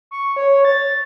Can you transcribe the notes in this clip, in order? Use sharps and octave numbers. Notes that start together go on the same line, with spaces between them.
C#6
C#5
A6